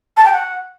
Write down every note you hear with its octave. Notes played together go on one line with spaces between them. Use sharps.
A5
G5
F#5